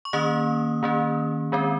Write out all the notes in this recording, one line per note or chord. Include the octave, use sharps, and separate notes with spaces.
C#6
D#3 A#3 C#4 D#6
D#3 A#3 C#4
D#3 G#3 C4